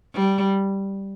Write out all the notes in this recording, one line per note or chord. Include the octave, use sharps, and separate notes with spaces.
G3